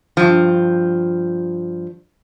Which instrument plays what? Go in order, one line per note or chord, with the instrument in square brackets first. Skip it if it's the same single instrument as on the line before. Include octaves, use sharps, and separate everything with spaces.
[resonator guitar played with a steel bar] G2 F3